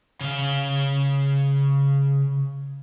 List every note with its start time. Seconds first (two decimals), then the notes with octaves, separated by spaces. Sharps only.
0.21 C#3 F5